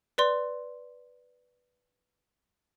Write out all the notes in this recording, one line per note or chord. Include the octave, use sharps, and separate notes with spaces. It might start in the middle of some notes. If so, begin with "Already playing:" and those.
B4 D5 C6